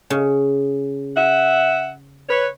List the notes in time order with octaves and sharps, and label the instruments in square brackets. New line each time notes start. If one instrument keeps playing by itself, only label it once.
[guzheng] C#3
[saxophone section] E5 F#5
B4 C#5